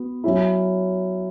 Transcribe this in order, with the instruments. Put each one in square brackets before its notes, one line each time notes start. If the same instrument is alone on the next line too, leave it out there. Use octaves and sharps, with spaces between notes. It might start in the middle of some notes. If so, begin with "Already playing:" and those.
Already playing: [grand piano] B3 F#4
F#3 C#4 E4